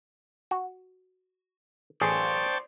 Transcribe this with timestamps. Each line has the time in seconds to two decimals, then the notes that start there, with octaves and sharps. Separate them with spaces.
0.51 F#4
2.01 A1 G#4 C5 D5 G5 A5 C#6